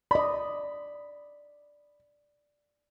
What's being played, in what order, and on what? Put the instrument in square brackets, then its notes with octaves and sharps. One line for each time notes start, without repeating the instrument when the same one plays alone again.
[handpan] D5 D#5 [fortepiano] B5